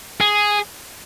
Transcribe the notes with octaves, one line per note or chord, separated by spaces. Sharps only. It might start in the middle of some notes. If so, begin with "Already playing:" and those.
G#4